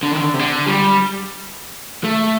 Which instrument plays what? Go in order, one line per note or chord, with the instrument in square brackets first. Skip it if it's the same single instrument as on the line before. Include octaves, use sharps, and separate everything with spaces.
[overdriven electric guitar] D3
D#3
D3
C3
D3
G3
A3